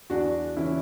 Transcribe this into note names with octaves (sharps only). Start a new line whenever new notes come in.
E2 D4 F#4
C#3 E3 C#4 E4